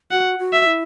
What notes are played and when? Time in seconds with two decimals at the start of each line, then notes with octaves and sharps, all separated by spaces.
0.11 F#4 F#5
0.39 F#4
0.53 E5
0.66 E4